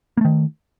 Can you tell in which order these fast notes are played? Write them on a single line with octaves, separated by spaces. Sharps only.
A#3 A3 D#3